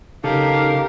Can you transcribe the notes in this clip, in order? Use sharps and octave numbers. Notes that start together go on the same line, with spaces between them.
C#3 D#4 G4 A4 A#4 F5